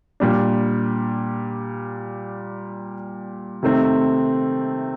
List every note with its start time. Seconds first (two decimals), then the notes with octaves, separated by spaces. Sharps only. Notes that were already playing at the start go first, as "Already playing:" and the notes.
0.20 A#2 G3 D4
3.63 C3 D#3 A3 C4